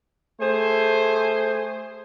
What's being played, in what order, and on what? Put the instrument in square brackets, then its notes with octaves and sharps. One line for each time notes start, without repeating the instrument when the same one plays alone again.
[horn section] A3 G#4 C5